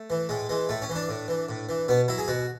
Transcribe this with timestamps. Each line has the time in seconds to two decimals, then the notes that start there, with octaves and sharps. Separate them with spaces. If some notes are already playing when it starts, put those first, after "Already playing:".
Already playing: A3
0.10 E3
0.29 A2 G#3
0.49 E3 G#3
0.69 A2 A3
0.82 C#4
0.90 E3
0.96 D4
1.09 A2
1.28 E3
1.49 A2
1.69 E3
1.88 B2 B3
2.08 F#3 E4
2.18 G#4
2.28 B2 F#4